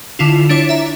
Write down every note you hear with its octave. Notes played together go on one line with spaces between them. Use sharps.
D3 E4 F4
D4 E4 C#5 D6
E5 A#5